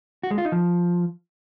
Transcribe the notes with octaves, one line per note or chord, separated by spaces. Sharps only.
F#4
G#3
F4
D#4
F3